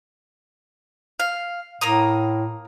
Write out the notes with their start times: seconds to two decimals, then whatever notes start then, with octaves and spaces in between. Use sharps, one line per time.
1.20 F5
1.81 A2 A#3 A#5 D#6